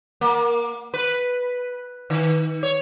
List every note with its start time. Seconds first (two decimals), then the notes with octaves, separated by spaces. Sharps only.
0.21 A#3
0.94 B4
2.10 D#3
2.63 C#5